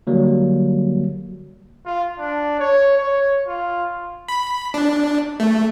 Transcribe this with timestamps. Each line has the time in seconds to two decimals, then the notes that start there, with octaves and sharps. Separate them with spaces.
0.07 D3 F#3 G3 A#3
1.86 F4
2.19 D4
2.59 C#5
2.98 C#5
3.47 F4
4.29 B5
4.74 D4
5.40 A3